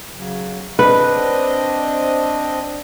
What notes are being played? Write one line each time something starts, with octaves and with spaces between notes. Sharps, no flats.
C#3 F#3
C4 D4 B4 D#5